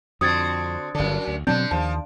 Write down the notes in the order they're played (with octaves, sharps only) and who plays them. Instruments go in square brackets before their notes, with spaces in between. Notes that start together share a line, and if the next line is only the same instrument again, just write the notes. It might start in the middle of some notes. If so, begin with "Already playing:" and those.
[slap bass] F2 [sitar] D3 C4 F#4 [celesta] D#6 G#6 A6
[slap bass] G1 D3 [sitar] F#2 D4
[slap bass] D2
[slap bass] B2 F#3 C4 [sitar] D3 D4 [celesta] G6
[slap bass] D#2 [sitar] F3 [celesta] A5